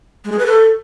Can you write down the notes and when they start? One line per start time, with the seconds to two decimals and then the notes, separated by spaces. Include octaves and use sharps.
0.25 G#3
0.32 G#4
0.39 B4
0.46 A4